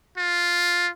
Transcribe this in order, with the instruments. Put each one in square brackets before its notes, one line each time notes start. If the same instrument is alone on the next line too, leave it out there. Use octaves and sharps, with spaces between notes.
[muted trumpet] F4